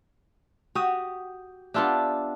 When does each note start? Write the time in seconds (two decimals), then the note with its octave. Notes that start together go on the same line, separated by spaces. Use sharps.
0.75 F#4 G4 D#6
1.74 B3 D4 F4 G4 E5 A5